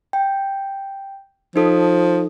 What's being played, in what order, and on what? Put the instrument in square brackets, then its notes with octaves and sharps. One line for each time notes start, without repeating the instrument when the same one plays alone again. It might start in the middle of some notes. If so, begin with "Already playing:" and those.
[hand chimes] G5
[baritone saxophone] F3 [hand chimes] D#4 A4 D#6